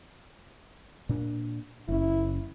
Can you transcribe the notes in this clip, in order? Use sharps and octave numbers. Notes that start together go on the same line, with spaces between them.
A#2 D4
F#1 C#4 E4